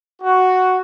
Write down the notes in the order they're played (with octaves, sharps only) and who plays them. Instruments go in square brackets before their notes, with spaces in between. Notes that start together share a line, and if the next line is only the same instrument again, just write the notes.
[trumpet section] F#4